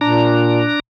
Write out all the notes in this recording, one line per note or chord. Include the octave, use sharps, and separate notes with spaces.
A#2 D4 A#5